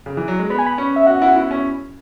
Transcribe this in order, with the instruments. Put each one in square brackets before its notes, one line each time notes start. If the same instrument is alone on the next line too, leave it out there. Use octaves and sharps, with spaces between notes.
[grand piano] C#3
E3
F#3
G#3
[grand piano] B3 [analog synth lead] B5
[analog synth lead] G#5
B5
[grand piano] C#4
[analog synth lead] E5
[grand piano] F#4 [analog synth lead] F#5
[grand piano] E4
E4
C#4